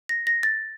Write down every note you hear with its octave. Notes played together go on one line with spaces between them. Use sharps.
A#6
A#6
A6